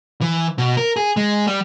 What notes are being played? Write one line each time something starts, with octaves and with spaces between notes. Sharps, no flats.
E3
B2
A#4
G#4
G#3
G3